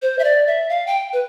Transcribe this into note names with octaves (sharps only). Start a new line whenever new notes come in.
C5
E5
D5
E5
F5
G5
B4